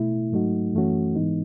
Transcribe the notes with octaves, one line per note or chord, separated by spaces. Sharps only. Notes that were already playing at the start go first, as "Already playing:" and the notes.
Already playing: B2 A3 E4
G#2 F#3 A3 D#4 F#4
F#2 E3 A3 C#4 F#4
G#2 E3 G#3 B3 D#4